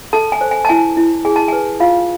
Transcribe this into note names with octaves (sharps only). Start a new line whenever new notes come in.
A4 A5
G#5
C5
G#5
A5
E4 G#5
E4
G#4 G#5
A5
B4 G#5
F4 F5